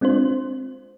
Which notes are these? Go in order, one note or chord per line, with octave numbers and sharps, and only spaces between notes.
G#3 C4 D4 F4 C5